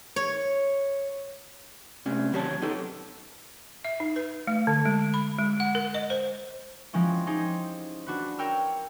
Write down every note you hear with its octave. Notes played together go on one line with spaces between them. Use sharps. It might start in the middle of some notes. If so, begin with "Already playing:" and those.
C#5
C3 A3 C#4 D4
D#2 F#3 G4 A4 C#5 A5
B3 D#4 G4 A4
E5
D#4
B4
A3
D3
G#3
B5
G#3
F#5
A#4
D#5
C5
F3 G#3 C4 C#4 E4
C#4 D#4 G4 G#4 C5
D4 F#4 B4
A#4 C#5 G5 E6 F6